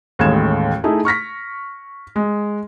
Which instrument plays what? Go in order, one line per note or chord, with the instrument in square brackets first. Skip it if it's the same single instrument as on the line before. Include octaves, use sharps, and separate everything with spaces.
[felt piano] A1 D#2 A2 G#3 G#6 E7
A3 D#4 E4 G#4
C#6 F6 A#6 B6
G#3